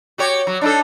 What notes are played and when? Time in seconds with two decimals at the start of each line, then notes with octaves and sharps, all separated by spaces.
0.18 F#4 G4 C#5
0.47 F#3
0.61 D4 D#4 A4